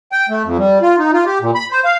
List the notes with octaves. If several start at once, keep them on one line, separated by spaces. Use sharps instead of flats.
G5
A3
F2
G3
F4
D#4
F4
G4
A#2
B5
C5
F5